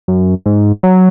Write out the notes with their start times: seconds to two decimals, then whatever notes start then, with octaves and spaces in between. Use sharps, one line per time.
0.08 F#2
0.46 G#2
0.83 F#3